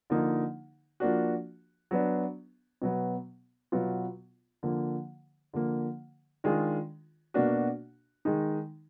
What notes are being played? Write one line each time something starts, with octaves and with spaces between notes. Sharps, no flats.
D3 F3 A#3 D#4
F3 A#3 D4 F#4
F#3 B3 D4
B2 F#3 B3
B2 F#3 B3 F4
D3 F3 A#3
D3 F3 A#3
D#3 G#3 D4 F4 G#4
B2 A#3 D4 F#4
D#3 G#3 D#4